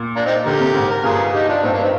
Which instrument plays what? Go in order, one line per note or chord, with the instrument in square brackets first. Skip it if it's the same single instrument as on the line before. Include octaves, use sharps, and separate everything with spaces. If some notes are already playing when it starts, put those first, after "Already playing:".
Already playing: [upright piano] A#2
[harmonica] A#3 D4
C4 D#4
[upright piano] D3 [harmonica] G4 A#4
[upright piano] C3
G#2
[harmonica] A#4
[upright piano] G2 [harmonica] F4 G#4
[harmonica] D#4 G4
D4 F4
[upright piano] G2 [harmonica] C4 D#4
[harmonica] A#3 D4
C4 D#4